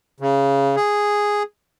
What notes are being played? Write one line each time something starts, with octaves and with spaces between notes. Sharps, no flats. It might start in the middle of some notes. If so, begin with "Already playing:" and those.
C#3
G#4